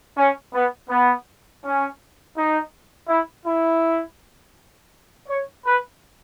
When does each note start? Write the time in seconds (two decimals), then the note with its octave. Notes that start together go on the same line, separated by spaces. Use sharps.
0.17 C#4
0.53 B3
0.90 B3
1.63 C#4
2.35 D#4
3.08 E4
3.46 E4
5.27 C#5
5.64 B4